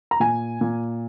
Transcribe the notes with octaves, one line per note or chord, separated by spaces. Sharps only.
A#5
A#2 G#5
A#2